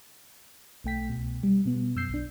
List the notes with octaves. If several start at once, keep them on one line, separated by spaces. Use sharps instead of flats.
B1 A3 G5 B6
C2 B2
G3
B2 B3
F#2 E6 G6 C7
B1 D4